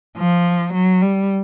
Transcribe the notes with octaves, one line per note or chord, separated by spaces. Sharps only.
F3
F#3
G3